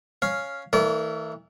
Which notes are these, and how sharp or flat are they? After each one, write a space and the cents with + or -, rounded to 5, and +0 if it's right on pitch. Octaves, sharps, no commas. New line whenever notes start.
C#4 +0 F5 -5
E3 -30 A3 +45 D5 -35